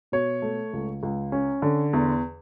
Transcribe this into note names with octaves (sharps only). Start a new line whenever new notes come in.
B2 C#5
A3
C#2
C#2
C#4
D3
E2